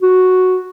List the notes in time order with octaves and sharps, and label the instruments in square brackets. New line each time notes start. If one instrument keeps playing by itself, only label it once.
[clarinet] F#4